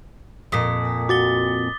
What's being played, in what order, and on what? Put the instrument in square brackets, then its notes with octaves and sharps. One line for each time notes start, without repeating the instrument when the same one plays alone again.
[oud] F2 A#2 [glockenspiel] D6 D#6 B6
[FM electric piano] F#4 [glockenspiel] D6 A6 G7